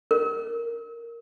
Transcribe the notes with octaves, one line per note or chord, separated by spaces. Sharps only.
A#4